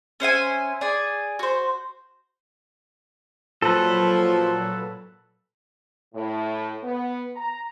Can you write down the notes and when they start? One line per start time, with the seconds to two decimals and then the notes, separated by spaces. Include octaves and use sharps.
0.20 C#4 C5 E5 G#5
0.81 G#4 D5 G#5
1.39 F#4 C5
3.62 A#2 F3 F#3 A4 B4
6.14 A2
6.83 B3
7.36 A#5